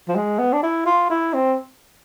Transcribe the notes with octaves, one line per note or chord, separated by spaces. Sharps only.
F3
G#3
B3
D4
E4
F4
E4
C4